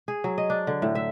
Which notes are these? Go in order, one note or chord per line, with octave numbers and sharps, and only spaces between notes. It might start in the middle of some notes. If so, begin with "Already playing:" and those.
G#4
F#3
D#5
D4
D3
A2
E5